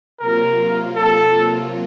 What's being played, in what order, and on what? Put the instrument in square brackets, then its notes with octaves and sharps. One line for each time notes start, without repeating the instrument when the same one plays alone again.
[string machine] C3 F#3 A#3 F4 [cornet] A#4
[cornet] A4